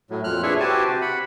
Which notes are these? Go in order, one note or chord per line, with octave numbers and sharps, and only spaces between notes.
A2 F#3
F2 A#2 F6 F#6
D4 E4 G#4 B4 C#5 E5
F#4 G4 B4 C5 G#5 A5
C3 G4
F#5 B5